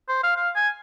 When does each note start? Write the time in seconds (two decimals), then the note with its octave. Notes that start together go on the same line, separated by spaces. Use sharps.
0.09 C5
0.23 F5
0.37 F5
0.56 G#5